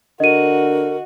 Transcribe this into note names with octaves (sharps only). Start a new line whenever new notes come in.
D3 F#4 A#4 D#5 D#7